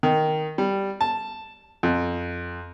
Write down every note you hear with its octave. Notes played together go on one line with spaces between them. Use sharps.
D#3
G3
A5
F2